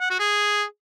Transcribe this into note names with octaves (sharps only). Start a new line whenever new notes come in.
F#5
F#4
G#4